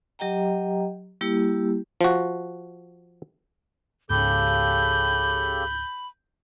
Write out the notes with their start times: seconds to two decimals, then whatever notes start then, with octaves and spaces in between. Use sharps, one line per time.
0.19 F#3 G4 D#5 G5 A#5
1.21 G3 A#3 E4 G4
2.01 F3 F#4
4.10 C#2 G#2 C#3 G4 A4 B5 G6